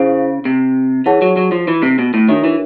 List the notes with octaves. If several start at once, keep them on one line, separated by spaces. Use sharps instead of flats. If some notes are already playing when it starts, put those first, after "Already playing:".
Already playing: C#3 E4 G#4 C5 F5
C3
E3 G#4 C#5 F#5 A5
F#3
F#3
F3
E3
C3
B2
A2
D#3 D4 F#4 A#4 C#5 E5
E3